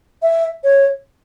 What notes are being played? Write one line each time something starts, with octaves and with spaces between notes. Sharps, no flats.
E5
C#5